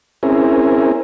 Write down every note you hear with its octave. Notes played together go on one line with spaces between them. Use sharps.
C4 C#4 E4 G#4 A#4